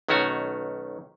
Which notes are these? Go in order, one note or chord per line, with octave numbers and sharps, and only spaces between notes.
B1 D#3 A3 C#4 F#4 C#5